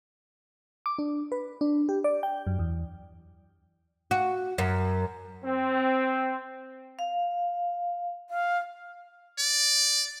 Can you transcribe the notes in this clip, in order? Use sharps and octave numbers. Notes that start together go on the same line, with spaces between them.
D6
D4
B4
D4
G4
D5
G5
F#2
E2
F#4
F#2
C4
F5
F5
D5